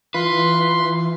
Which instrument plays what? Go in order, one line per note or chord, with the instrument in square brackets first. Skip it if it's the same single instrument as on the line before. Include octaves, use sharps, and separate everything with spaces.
[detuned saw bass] E3 [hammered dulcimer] F4 [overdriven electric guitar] B4 [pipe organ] C6